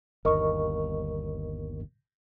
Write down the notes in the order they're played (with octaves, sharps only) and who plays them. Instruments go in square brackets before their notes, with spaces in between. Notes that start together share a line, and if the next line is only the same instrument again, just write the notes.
[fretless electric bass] G1 D#2 [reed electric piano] A#4 D#5 C#6